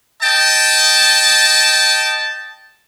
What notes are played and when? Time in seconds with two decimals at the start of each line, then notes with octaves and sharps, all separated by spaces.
0.22 D#5 G5 A5